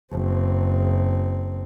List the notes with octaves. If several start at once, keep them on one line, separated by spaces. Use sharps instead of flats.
F#1 C4